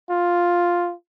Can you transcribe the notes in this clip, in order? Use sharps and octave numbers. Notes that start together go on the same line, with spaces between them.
F4